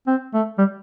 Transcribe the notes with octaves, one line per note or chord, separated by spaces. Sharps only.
C4
A3
G3